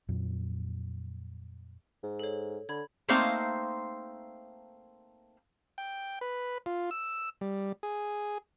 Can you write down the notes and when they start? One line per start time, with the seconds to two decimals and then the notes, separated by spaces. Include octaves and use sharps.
0.09 F2 A#2 F#3
2.03 G#2
2.19 A4 C#5
2.69 D3 B5 G#6
3.08 A3 A#3 C4 D#4 C5 F5
5.78 G5
6.21 B4
6.66 F4
6.91 E6
7.41 G3
7.83 G#4